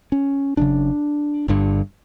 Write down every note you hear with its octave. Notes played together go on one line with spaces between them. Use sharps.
C#4
F#1 F#2 C#3 D4
G1 G2 D3